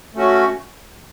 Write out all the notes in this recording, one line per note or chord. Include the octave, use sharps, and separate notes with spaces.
A3 C#4 F#4